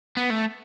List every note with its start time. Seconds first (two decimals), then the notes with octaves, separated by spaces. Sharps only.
0.17 B3
0.31 A3